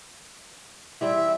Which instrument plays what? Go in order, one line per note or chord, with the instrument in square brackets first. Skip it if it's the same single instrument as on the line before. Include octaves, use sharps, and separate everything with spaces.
[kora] E3 G3 C4 [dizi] E5